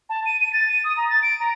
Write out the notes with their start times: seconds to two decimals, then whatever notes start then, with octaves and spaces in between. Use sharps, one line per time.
0.09 A5
0.26 D#7
0.40 D#7
0.53 A6
0.70 D#7
0.84 D#6
0.97 A#5
1.10 A6
1.23 D7
1.40 A#5